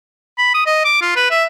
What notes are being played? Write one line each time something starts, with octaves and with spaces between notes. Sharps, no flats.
B5
D#6
D#5
D6
F4
B4
E5